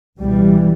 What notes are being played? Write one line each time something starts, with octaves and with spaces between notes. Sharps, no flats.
C#2 B2 E3 G3